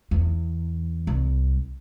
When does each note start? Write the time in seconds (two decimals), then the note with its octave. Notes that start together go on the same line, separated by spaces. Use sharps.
0.11 E2
1.07 C2